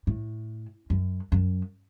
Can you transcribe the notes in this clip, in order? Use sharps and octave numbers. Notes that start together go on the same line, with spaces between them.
A2
F#2
F#2